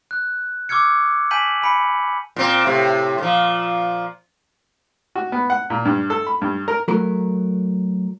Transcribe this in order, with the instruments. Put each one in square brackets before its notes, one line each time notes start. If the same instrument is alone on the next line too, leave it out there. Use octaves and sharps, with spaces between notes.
[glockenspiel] F#6
C#6 D6 E6 F6 G#6 C#7
G#5 A5 G6 B6 D#7 F#7
G#5 B5 C#7
[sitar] A#2 C4
A2 C3
A#2 F3
[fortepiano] F#4
B3
F#5
A#2
G2
A4
B5
G2
A#4
[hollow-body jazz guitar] F#3 A3 A#4